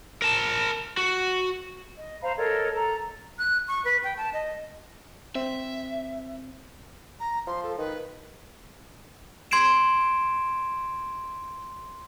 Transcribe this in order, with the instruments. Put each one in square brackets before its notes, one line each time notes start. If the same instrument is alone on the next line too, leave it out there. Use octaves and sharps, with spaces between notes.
[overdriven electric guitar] A#4 A5
F#4
[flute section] D#5
C5 F5 A#5 B5
A4 A#4 C#5 D#5
A4 A#5
[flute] F#6
C#6
B4
G5
A5
D#5
[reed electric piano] C4 [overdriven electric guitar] E5
[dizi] A#5
[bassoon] F3 [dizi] C6
[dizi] A4
[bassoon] D#3 [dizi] B4
[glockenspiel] C6 G#6 C7 D7 E7